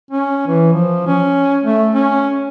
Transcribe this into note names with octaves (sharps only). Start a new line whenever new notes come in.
C#4
E3
F3
C#4
A3
C#4